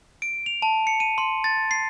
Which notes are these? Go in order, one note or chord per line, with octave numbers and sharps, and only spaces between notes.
D7
F7
A5
C#7
D#7
C6
A6
C7